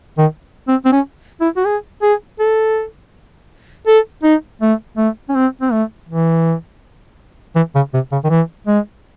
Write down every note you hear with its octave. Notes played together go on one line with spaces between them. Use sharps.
D#3
C4
C4
C#4
E4
F#4
G#4
G#4
A4
A4
D#4
A3
A3
C#4
C4
C4
A3
E3
E3
C#3
C3
C#3
D#3
E3
G#3